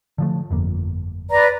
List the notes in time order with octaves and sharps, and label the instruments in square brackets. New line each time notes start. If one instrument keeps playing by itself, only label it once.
[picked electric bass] D3 F3 A3
G1 F2 A#3
[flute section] B4 D5 A#5